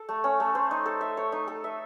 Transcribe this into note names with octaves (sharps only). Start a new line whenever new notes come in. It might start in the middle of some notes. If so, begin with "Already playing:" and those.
Already playing: A4
A3
C#4
A3
C5
D#4
A4
E5
C#5
D#4
A4
E5